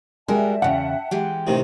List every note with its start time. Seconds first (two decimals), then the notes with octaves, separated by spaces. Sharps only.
0.28 G3 G#3 F#4 A#4 E5 G5 A5
0.62 E2 C#3 F#5
1.11 E3 G#3 G4
1.47 A1 C3 D#3